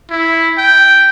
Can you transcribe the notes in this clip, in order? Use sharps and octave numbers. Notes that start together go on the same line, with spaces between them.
E4
G5